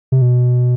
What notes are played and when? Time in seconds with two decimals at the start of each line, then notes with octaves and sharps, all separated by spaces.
0.12 C3
0.22 B2